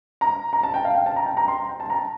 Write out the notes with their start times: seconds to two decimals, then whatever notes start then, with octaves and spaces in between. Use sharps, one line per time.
0.21 A#5
0.53 A#5
0.63 A5
0.74 G5
0.85 F5
0.95 G5
1.06 A5
1.16 A#5
1.26 G5
1.37 A#5
1.48 C6
1.69 G5
1.80 A5
1.90 A#5